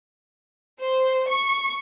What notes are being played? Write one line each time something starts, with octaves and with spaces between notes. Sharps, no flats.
C5
C#6